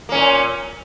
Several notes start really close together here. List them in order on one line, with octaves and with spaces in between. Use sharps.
A#3 C#4 A#2